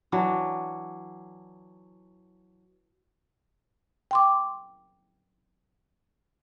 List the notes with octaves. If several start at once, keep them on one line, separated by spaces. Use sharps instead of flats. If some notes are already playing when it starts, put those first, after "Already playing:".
E3 F#3 D4
G5 C6 D6